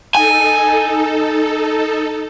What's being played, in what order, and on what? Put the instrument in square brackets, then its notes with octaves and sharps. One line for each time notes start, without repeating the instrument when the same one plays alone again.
[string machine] D#4 A4 [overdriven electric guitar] G#5